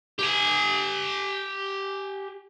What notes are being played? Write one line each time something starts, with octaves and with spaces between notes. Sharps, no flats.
G4 G#5